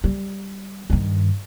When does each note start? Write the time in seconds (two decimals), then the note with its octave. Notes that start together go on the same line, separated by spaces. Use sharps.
0.04 G3
0.90 G2 D#3